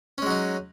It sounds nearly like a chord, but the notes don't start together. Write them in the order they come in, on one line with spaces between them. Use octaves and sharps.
C#4 G#3 F#3 D#4